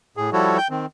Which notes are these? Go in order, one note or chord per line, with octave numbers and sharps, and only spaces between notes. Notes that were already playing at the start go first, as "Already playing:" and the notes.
A2 G#4
F3 G3 E4 F#4 A4 C#5
G5 G6
D#3 C4